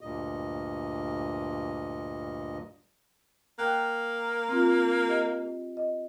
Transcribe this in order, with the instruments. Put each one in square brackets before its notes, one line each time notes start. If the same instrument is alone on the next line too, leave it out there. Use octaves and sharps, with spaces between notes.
[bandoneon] D2 G2 A#2 D#5
[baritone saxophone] A#3 [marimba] G5 F#6
[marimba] C4 F4
G4 D#5
D#5